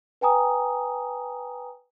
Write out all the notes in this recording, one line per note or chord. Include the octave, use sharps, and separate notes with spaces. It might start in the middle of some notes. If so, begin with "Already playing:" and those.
B4 G5 G#5 A#5 D#6